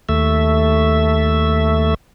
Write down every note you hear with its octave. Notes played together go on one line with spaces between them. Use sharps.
D#2 A3 E5